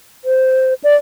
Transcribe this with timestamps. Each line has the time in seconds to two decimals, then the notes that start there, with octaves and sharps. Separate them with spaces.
0.25 C5
0.84 D5